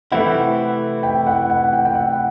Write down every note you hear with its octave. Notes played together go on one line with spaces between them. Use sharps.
C3 E3 A3 C4 E4 F#5
G5
F#5
F#5
G5
G5
F#5